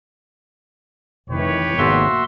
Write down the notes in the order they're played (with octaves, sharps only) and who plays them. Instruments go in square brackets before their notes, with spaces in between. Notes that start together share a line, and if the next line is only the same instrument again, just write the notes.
[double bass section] F1 D#3 E3 [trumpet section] G4 B4 C#5
[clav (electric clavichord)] G#1 G#2 B3 [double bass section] A#3 [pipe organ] F#4 E5 C6